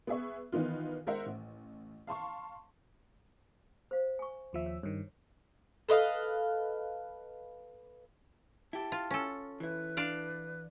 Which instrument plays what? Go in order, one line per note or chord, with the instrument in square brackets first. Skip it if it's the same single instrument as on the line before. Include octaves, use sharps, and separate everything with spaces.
[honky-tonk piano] B3 G#4 E5 C#6
D#3 E3 B3 D#4 F4
G#3 A#4 C5 E5 F#5
A1
F5 A5 C6 C#6
[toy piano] C5 F5
G#5 C#6
[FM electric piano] D#2 F3 E5
[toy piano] C#5
[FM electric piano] G2 D#3 [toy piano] C#5
[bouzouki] A4 B4 D#5 F5
[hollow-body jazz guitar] E4 G4 [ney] A5
[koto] F4
C#4 A4
[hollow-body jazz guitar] E3 E4 [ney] B4
[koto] D4 D5 F5